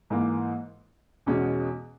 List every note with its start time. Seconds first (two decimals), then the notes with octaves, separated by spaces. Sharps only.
0.10 G#2 E3 A#3
1.26 E2 B2 G#3 C#4 F#4